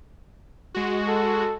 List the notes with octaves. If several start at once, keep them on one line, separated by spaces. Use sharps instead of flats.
G#3 F#4
A4